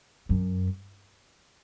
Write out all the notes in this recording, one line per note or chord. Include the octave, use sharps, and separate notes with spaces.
F#2